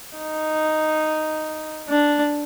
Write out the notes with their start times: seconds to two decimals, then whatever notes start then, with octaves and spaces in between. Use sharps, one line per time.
0.17 D#4
1.89 D4